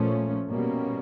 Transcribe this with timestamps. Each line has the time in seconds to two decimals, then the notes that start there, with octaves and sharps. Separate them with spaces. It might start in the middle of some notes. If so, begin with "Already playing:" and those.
Already playing: A#2 F3 A3 C#4
0.50 B2 G3 A#3 C#4